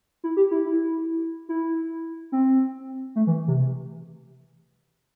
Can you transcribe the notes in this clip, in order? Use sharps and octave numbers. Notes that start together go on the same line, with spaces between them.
E4
G4
E4
E4
E4
C4
A3
E3
C3